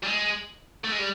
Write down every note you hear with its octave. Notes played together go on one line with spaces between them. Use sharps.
G3
G#3
A3
G#3
G3